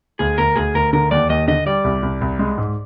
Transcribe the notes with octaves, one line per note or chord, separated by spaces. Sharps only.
D2 G#4
D2 A#4
D2 G#4
D2 A#4
D3 A#4
D#2 D5
D#2 D#5
D3 D#5
G3 D5
C2
C2
C2
G#3
G#2